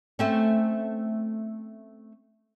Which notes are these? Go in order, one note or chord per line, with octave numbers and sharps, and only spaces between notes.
A3 C4 C#4